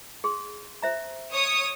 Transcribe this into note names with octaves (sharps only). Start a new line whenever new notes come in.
G#4 C6
C5 E5 A#5
C#5 D#6